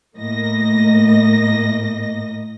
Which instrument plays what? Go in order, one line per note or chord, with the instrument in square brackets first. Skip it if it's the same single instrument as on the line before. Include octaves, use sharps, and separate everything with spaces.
[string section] A2 A#3 D#5 A#6